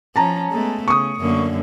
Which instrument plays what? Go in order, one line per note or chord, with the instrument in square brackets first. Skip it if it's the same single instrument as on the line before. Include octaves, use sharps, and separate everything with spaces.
[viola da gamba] F3 C#4 [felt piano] A5 A#5
[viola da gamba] G#3 A3 B3
[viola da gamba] C#3 [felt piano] C#6 D#6
[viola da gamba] F#2 D3 A#3